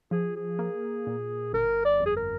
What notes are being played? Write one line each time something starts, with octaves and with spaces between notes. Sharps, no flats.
F3 G#4
G#4
A#3
A#2
G1 A#4
D5
F2
G#4
A#4